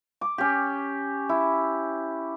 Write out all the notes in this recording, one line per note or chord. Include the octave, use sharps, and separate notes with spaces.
D6
C#4 G4
E4